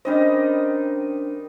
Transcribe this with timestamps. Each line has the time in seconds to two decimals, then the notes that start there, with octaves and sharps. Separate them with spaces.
0.05 D#3 G3 C#4 D4 C5 D#5